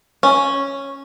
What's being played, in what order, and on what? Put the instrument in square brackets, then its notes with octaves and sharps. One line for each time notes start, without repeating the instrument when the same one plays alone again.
[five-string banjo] C#4